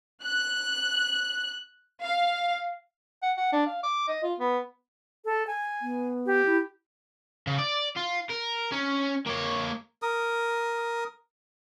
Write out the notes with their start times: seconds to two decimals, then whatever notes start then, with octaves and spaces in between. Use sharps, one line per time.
0.25 F#6
2.03 F5
3.23 F#5
3.38 F#5
3.53 D4
3.67 F5
3.83 D6
4.08 D#5
4.23 F4
4.40 B3
5.25 A4
5.47 G#5
5.82 B3
6.26 G4
6.46 E4
7.47 C#3
7.58 D5
7.97 F4
8.30 A#4
8.72 C#4
9.27 A#3 C#5
10.02 A#4 D#6